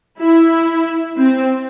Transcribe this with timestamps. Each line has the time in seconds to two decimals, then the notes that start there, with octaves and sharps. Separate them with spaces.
0.20 E4
1.18 C4